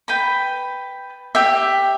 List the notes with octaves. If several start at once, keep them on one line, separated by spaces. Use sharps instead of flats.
B4 G5 B5
G4 E5 G5